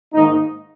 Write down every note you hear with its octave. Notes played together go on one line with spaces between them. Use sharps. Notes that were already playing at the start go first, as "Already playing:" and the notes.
G#2 D#3 A#3 D#4